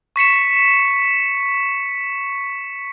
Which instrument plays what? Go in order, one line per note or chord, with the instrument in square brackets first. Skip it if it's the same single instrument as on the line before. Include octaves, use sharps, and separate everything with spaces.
[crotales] C#6 B6 C#7 E7